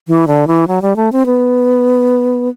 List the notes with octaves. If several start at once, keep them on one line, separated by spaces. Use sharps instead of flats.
E3
D3
E3
F#3
G3
A3
C4
B3